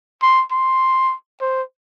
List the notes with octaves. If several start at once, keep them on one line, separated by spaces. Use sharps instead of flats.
C6
C6
C5